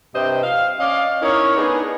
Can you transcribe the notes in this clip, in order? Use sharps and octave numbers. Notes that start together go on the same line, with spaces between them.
G2 C3 C5 D#5 G5
F5
C#4 D5 D#5 F5
C#4 D#4 E4 A#4 C#5
B3 D4 D#4 G#4